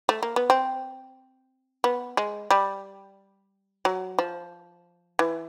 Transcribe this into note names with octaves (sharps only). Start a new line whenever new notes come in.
A3
A#3
B3
C4
B3
G#3
G3
F#3
F3
E3